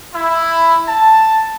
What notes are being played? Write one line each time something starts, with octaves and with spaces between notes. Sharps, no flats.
E4
A5